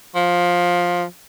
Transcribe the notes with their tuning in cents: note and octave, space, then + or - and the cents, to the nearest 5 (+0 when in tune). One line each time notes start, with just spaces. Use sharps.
F3 +15